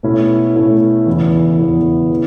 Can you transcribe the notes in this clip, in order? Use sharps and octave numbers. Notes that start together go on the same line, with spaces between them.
B2 A3 C#4 E4
B2 A3 C#4 E4
E2 C#3 E3 B3 E4
E2 C#3 E3 B3 E4
C#3 E3